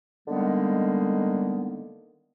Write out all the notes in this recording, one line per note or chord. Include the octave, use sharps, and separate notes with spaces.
D3 D#3 G3 G#3 A#3 B3